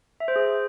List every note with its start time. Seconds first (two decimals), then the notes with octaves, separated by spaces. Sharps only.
0.20 E5
0.28 C5
0.36 G#4